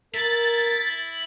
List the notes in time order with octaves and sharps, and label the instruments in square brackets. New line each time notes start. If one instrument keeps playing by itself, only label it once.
[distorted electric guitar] E4 [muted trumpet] A#4 [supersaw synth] A6